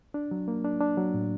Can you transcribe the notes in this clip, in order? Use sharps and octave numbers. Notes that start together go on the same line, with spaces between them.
D4
F#3
A#3
D4
D4
F#3
A2